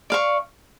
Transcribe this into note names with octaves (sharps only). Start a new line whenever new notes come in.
D5 F5 C#6